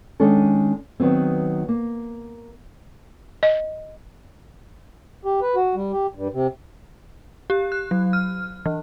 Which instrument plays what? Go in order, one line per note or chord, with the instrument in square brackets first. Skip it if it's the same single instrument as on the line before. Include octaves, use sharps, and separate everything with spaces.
[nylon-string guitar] D#3 G#3 C#4 D4 A4
D#3 F#3 B3 C4
A#3
[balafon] D#5
[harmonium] G4
B4
F#4
G3
G4
G2
C3
[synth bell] G4
F#6
F#3
F6
E3